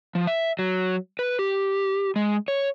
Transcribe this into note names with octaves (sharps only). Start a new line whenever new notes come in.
F3
E5
F#3
B4
G4
G#3
C#5